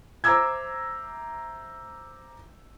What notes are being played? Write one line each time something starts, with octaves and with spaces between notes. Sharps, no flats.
C5 E5 A#5 D6 E6 G#6